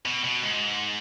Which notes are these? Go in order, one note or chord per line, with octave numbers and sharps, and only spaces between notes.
B2
B2
G#2